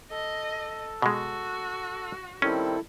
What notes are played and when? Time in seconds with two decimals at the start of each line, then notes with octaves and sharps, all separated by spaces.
0.11 A4 D#5
1.02 B2 G#3 F#4
2.42 D#3 G3 C4 C#4 E4 A4